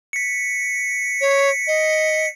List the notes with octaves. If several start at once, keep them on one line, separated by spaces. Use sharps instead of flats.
B6 C#7
C#5
D#5